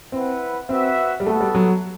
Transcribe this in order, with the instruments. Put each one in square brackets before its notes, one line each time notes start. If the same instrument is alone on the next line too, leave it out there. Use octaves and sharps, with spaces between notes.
[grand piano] C4 [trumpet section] E4 B4 F#5
[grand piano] C4 [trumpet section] F#4 B4 E5
[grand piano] G3
[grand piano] A3 [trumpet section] B3 F#4 A4
[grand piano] G3
F#3